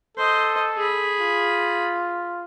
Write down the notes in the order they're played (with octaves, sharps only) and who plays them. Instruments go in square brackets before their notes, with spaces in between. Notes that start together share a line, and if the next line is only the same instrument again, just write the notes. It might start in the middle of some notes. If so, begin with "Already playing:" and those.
[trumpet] A4 [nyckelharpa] C5 D#5
[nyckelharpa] G#4 B5
[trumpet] F4